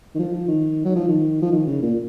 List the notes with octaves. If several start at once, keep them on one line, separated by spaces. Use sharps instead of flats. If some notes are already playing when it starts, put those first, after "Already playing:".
D#3
F3
F3
D#3
F#3
F3
D#3
F3
D#3
C#3
A#2